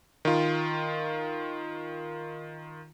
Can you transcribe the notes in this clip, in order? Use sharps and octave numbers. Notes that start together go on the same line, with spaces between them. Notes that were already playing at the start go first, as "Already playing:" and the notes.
D#3 F4